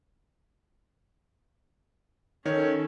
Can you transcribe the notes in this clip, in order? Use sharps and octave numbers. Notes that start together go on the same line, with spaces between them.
D#3 C#4 A4 C#5